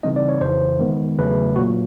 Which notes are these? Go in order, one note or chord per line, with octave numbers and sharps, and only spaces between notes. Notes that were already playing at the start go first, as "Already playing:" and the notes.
C#3 E3 G3 C4 D#4 D#5
D5
C#5
F2 C#3 E3 C5
D#3 G#3 B3
E2 C#3 F#3 A3 B4
A#2 F#3 A#3 F#4